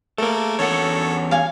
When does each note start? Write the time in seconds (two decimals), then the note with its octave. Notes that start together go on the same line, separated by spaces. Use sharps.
0.18 A3 A#3 A4 A#4
0.59 E2 C#4 A4 C#5 F#5
1.31 F5 G#5